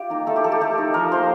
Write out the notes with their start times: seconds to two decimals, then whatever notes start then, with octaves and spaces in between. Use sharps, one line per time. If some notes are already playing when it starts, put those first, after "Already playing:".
Already playing: F4 G4
0.10 A#3 D#4
0.27 A3 A4
0.36 G4
0.44 D#4 A4
0.52 G4
0.61 A3 A4
0.78 D#4
0.94 F3 A#4
1.12 A#3 F4 C5